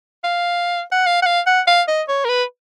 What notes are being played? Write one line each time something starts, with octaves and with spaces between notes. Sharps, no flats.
F5
F#5
F5
F#5
F5
F#5
F5
D#5
C#5
A#4
B4